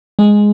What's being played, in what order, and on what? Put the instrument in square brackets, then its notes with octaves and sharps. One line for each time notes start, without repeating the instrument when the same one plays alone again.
[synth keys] G#3